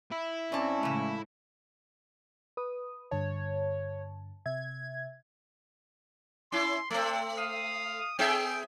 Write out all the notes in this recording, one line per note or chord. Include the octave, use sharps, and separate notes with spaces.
E4
G2 C4 C#4 D5 A5
A2 C#3 E3 G#3 A3
B4 D#6
G2 D3 C#5 A5
C3 E5 G#6
C#4 E4 C6
A3 C4 D4 A4
F5 D#6
B3 G#4 E5 G5